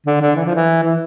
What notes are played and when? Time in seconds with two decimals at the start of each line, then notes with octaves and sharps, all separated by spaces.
0.06 D3
0.21 D3
0.36 E3
0.46 F3
0.55 E3
0.83 E3